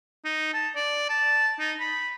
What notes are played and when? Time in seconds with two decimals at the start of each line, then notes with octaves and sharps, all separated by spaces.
0.25 D#4
0.54 A5
0.76 D5
1.09 A5
1.59 D#4
1.80 B5